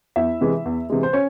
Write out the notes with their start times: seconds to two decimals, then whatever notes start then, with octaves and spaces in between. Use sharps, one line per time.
0.16 E2 E4 E5
0.41 C3 E3 G#3
0.65 E2
0.90 C3 E3 G#3
1.03 C5
1.13 C#4 C#5